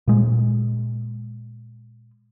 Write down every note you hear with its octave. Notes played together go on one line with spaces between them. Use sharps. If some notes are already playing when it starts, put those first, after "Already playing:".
A#2 G#3